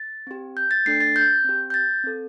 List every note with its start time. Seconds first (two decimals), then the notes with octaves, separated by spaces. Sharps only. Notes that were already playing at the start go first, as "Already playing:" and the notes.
Already playing: A6
0.27 C4 G4
0.57 G6
0.71 A6
0.86 A3 D4 A4 C7
1.00 A6
1.16 G6
1.44 C4 G4
1.70 G6
1.74 A6
2.04 C4 A4